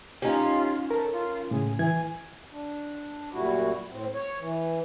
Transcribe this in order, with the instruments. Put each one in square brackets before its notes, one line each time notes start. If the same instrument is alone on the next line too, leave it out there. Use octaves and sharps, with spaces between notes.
[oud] C#4 D#4 [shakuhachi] F4 [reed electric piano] G4
[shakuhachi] A4 [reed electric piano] A#4
[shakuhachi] F4
[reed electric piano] A2 C#3 [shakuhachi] G#4
[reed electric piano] E3 G#6 [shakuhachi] G#5
[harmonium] D4
F#2 A#2 G3 A3 E4 F#4
A2 C4
C#5
E3